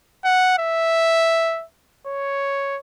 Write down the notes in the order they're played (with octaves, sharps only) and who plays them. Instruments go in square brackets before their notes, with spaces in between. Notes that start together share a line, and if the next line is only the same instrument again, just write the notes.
[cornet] F#5
E5
C#5